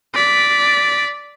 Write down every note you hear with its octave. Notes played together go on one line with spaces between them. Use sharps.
D5 B6